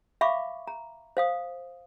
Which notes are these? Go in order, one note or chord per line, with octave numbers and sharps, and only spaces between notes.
E5 F5 B5 C#6 D6
A#5
C5 F5 D#6